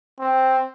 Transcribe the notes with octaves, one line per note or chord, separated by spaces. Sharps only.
C4